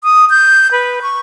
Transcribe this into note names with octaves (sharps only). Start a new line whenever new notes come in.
D#6
G6
B4
C#6